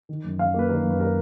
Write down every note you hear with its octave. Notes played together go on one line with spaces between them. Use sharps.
D#3
F#2
F#2 F5
A#3 B4
D#3 A#4
F#2
B4
A#4